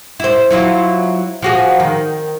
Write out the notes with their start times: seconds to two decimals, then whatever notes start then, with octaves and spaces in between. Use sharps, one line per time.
0.20 E4 C5
0.51 F#3 E4 F4
1.42 F3 F#4 G#4
1.80 D#3